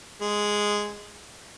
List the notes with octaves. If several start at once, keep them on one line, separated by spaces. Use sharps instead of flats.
G#3